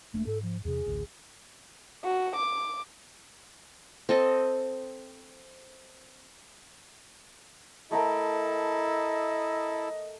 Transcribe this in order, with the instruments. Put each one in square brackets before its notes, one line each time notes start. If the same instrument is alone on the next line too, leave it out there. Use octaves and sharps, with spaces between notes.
[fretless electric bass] E1 A#3 D4 [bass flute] A3
[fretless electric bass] G#2 [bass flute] A4
[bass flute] F3
[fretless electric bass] E2 C3 [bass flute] G#4
[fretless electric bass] A1 D2
[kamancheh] F#4
D6
[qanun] C4 A4 D#5
[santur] A3 A#4 G5 [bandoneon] E4 A4 [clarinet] D#5